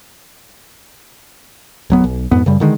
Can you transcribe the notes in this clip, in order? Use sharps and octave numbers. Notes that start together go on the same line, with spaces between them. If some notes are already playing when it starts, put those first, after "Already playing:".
D1 F#3 B3
B1
F2 G#2 B3
F#2 C#3 G3
D3 D#3 G#3